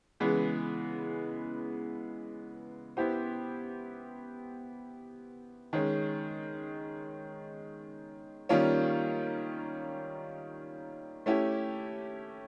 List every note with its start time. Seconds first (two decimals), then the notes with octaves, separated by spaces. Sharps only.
0.20 C#3 E3 G#3 B3
2.97 B3 E4 G4 C5
5.73 D#3 G#3 C#4
8.49 D#3 G3 A#3 C#4 F4
11.26 A3 C#4 E4 G4